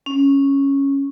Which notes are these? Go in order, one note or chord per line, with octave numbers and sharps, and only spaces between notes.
C#4